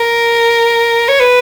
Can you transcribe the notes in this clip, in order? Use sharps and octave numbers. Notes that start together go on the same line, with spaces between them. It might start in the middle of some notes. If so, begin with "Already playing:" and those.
Already playing: A#4
C#5
B4